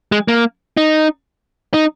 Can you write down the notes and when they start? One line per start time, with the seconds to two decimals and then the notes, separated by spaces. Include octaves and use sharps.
0.12 G#3
0.28 A#3
0.77 D#4
1.74 D#4